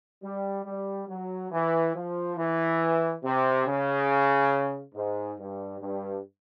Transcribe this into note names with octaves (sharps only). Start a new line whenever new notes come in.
G3
G3
F#3
E3
F3
E3
C3
C#3
G#2
G2
G2